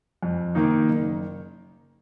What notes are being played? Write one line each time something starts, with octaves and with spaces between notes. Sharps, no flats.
F2
D#3 A#3 D#4
F#1